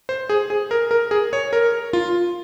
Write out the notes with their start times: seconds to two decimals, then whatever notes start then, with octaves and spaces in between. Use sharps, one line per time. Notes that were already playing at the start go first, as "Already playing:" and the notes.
0.09 C5
0.29 G#4
0.50 G#4
0.71 A#4
0.91 A#4
1.11 G#4
1.33 C#5
1.53 A#4
1.93 F4